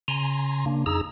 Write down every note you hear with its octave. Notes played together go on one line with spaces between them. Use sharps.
C#3 G#5 A#5 C6
C#3 A#3 D4
F2 D#4 G#4 A#5 E6